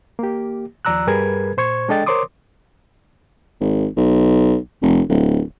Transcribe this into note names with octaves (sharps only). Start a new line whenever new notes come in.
A#3 G4
D#2 F3 D5 A#5 E6 F#6
G2 G3 G#4 A#4 B4 G#6
A#2 C5 C#6 G#6
G#3 D4 A4 D#5 G5 A6
A#4 C5 C#5 C6 D6 D#6
G#1
B1
F1
D1